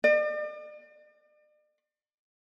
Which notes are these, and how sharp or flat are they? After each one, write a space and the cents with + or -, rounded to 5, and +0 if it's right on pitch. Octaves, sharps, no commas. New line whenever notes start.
D5 +45